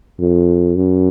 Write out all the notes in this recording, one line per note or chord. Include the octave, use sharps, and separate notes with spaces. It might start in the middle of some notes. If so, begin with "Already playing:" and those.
F2
F#2